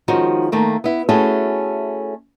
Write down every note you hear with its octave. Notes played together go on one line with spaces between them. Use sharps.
D#3 F3 G#3 C#4 D#4 F#4
D#3 A3 A#3
B3 E4
A3 C#4 E4 F#4 G#4 A4